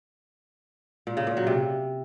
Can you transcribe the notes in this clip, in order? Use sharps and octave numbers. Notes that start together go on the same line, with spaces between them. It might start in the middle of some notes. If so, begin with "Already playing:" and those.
A#2
C#3
A#2
F#3
C3